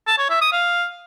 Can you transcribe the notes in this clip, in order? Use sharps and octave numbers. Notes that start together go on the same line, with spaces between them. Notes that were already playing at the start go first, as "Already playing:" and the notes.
A5
C#5
E5
D#6
F5